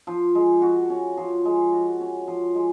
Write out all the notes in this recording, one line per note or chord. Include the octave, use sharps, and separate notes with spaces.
F3
G#3
F#4
C#4
F3
G#3
F#4
C#4
F3
G#3